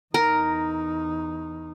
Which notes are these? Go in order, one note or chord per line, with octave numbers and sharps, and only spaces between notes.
E2 D#4 A#4